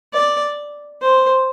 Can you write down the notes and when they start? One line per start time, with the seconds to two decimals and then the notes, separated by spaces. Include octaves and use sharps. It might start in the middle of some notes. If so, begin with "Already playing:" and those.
0.13 D5
1.02 C5